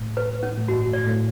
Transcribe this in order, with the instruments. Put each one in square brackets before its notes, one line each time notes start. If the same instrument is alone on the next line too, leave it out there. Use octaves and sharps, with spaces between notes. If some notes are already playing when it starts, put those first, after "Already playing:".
Already playing: [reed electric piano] A2
[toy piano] B4
C#4
[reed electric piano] A2
[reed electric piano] G2 [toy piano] F#4
[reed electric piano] A2
[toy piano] D5
[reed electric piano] A2